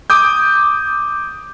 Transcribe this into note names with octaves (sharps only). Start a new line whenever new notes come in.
D6 D#6 G6